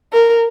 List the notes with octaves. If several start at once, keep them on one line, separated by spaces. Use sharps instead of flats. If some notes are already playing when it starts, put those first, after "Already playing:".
A#4